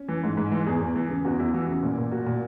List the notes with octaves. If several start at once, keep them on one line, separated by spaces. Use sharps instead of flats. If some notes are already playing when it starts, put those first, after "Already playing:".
Already playing: C#4
E3
G#2
G#2
E3
E2 G#4
E2
E3
C#3
E2 F#4
E2 E4
E3 F#4
C#3
A#2
A#2
A#2 F#4
A#2